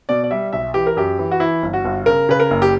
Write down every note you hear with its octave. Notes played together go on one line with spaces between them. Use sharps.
B2 D5
D5
G3 E5
B1 E5
E3 G4
A#4
F#2 G4
E3
F#4
E3 E4
G1
F#4
G1
C#3 A#4
C#3 B4
A#4
F#1
G4